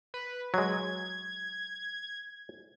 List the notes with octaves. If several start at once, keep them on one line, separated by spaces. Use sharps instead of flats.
B4
F#3 G#3 G#6